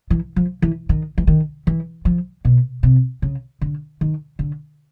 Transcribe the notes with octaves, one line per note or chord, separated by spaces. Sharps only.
E3
F3
E3
D#3
E3
D#3
E3
F3
B2
C3
C#3
D3
D#3
D3